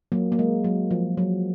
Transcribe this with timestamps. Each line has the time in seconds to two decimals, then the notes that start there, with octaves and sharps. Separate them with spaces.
0.12 F#3 A#3
0.32 A#3
0.39 G#3
0.64 F#3
0.91 F3
1.17 F#3